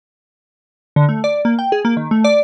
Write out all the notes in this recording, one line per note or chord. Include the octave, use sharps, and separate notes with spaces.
D3
A3
D5
A#3
G5
G#4
A#3
D#3
A3
D5